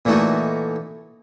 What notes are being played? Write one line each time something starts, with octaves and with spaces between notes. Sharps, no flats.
A#2 E3 A3 D#4 F#4